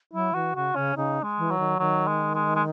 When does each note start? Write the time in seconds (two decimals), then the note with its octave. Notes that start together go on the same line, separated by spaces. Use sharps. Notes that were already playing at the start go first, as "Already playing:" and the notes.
0.13 F#3 E4
0.34 E3 F#4
0.56 C#3 F#4
0.75 C#3 C#4
0.96 C#3 D#4
1.23 G#3
1.38 E3
1.51 F#3
1.59 D#3
1.79 D#3 F#3
2.08 G#3
2.35 G#3
2.56 G#3